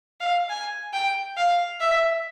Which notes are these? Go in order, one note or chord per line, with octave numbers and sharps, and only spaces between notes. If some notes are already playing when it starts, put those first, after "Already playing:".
F5
G#5
G5
F5
E5